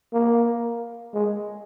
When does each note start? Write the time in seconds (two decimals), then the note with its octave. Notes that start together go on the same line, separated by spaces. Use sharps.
0.13 A#3
1.14 G#3